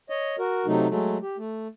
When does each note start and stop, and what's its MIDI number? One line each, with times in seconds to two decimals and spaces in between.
0.10 0.36 73
0.10 0.36 75
0.39 0.66 66
0.39 0.66 70
0.66 0.87 48
0.66 0.87 54
0.66 0.87 57
0.66 0.87 63
0.89 1.18 54
0.89 1.18 56
0.89 1.18 57
1.22 1.37 67
1.38 1.68 57